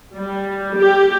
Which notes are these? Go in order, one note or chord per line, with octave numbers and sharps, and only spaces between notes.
G3
G4